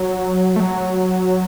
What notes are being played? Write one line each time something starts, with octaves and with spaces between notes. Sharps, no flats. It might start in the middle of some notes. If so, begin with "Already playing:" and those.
Already playing: F#3
A3
F#3